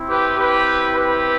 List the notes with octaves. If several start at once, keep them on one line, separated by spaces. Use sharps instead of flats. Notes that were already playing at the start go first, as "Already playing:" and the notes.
Already playing: C4 E4
G4 B4
G4 B4
G4 B4